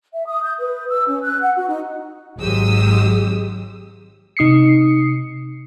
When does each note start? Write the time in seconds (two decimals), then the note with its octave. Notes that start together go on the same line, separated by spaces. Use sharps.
0.13 E5
0.27 D#6
0.43 G6
0.60 B4
0.89 E6
1.08 C#4
1.22 F#6
1.42 F#5
1.56 F#4
1.68 D#4
2.39 G#1 F#3 G#3 G4 D#6 E6
4.37 C3 D#4 D#6 C7 C#7